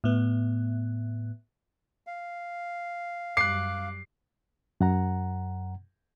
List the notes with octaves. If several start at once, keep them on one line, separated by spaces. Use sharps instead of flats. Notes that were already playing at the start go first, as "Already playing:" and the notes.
A2 B3
F5
F#2 G3 D6 F#6 C7
F#2 F#5 A#5